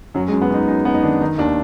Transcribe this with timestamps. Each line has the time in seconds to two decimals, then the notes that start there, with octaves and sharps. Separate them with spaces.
0.14 F#2 F#3
0.28 G#3
0.32 F#2
0.41 B3
0.50 F#2 D#4
0.68 F#2 D#4
0.85 F#2 B3
0.94 D#4
1.03 D#3 D4
1.21 D#3 D#4
1.38 D#2 D4